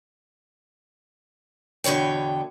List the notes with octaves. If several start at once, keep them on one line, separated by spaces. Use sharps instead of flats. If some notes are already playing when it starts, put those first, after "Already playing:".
E2 B2 D3 C#5 G5